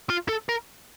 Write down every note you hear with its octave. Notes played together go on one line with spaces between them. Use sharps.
F4
A4
A#4